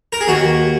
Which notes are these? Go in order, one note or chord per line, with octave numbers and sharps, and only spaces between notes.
A#4
G#4
D#2 F#4